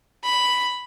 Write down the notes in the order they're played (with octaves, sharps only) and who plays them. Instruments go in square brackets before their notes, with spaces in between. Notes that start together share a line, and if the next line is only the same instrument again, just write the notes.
[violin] B5